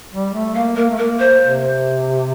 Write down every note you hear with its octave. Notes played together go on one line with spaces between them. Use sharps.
G3
A3
A#3 F5
A#3 A#4
A3
A#3 A#4
C5
C3